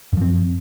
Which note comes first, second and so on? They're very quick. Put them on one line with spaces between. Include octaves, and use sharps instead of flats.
F#2 F3 C4